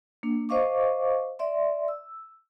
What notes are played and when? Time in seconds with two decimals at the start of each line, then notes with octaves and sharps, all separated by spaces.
0.23 A#3 D4
0.49 C5 D#5 F5 C#6 D6
1.39 D5 E5 C6
1.88 E6